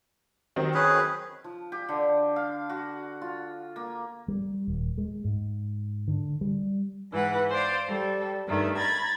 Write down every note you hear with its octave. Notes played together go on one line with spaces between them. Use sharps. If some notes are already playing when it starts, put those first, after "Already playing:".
D#3 F#3 C4
C#4 G#4 B4
F3
G4
D3
F5
F#4
F4
A#3
G3
D#1
G#3
G#2
D3
G3
G#2 E3 B4 F#5
C5 D5 F5
G3 A4
G2 D#3 A3
A#5 B5 G#6 A6